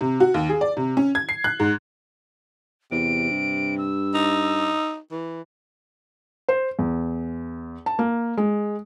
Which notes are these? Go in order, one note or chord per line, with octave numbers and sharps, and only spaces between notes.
C3
F#4
D#2
G#4
D5
C3
C#4
G#6
C7
F#6
G#2
E2 C3 D7
G2
E6
D#4
E3
C5
E2
A5
A#3
G#3